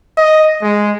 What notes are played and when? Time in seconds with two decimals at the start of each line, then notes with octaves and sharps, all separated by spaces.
0.17 D#5
0.62 G#3